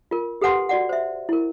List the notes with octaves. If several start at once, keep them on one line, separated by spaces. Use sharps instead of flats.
F4 A#4
G4 A4 B4 F#5 G#5 C6
F#4 D5 F#5
C5 E5
E4 A#4